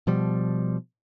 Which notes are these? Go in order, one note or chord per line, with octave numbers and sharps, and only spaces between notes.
B2 F3 G3